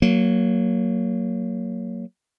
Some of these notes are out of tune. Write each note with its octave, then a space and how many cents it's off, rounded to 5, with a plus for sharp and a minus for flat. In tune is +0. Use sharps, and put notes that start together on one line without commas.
F#3 +10 A#3 -5